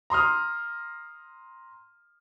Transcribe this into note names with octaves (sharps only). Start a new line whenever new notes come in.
A#5 C6 D#6 F6